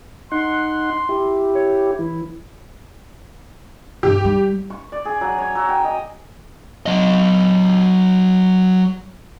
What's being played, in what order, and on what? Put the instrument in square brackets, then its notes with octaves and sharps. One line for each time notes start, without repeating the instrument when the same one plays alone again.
[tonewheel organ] D#4 F#5 [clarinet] C6
[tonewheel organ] E4 G4
[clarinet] C#5
[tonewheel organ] E3 [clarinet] E4
[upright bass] G2 D3 [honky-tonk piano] G4
[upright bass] G3 E4
[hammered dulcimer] C#6
D5
G#4
F#3
C#5
F#3
G5
D#5
[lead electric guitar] F#3 D#5